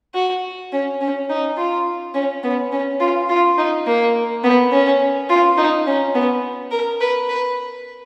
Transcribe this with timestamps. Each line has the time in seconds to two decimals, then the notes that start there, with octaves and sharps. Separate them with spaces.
0.14 F#4
0.73 C#4
1.01 C#4
1.29 D#4
1.57 F4
2.14 C#4
2.43 B3
2.72 C#4
3.00 F4
3.29 F4
3.58 D#4
3.87 A#3
4.44 B3
4.72 C#4
5.29 F4
5.57 D#4
5.86 C#4
6.15 B3
6.71 A#4
7.01 B4
7.29 B4